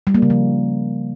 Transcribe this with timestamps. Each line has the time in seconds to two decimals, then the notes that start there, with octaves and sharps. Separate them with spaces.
0.07 G3
0.15 A#3
0.22 C#3
0.30 F3